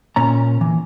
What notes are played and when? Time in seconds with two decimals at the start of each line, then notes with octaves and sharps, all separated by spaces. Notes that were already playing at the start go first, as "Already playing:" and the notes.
0.16 A#2 C#4 A#5
0.61 E3